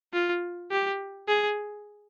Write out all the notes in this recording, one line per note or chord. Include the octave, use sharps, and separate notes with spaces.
F4
G4
G#4